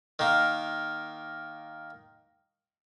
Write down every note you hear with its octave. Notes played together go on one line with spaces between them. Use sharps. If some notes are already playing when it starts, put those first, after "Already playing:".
D#3 A#3